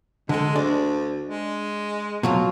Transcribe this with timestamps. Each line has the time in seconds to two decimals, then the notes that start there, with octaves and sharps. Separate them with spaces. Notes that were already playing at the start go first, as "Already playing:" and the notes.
0.29 D3 G#3 A4
0.56 D2 D4
1.29 G#3
2.23 B2 F#3 F4